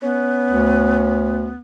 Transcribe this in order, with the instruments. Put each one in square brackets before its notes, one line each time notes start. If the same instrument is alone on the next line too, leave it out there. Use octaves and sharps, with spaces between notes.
[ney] B3 [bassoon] C#4
[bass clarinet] D2